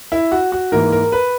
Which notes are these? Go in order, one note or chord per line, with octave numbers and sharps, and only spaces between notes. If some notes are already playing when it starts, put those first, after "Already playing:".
E4
F#4
F#4
G#2 E3 A#3 A#4
A#4
B4